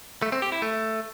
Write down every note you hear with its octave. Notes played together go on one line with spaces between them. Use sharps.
A3
C4
G4
E4
A3